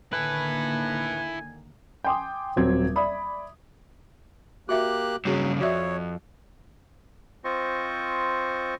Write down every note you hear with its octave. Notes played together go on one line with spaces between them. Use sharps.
D3 D#3 A#3 E4 A4 B4 G#5
G5 G#5 C6 D6 D#6
D#1 F#3 C4 G#6
D5 E5 B5 D#6
A#3 F#4 G4 E5 D6 F#6
G2 C#3 F#3 F#4 G#4
F2 F#4 C#5 D5 E5
C4 F4 C5 D#5 C#6